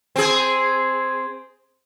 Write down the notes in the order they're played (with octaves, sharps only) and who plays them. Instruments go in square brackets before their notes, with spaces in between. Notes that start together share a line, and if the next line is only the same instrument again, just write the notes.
[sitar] C4 G#4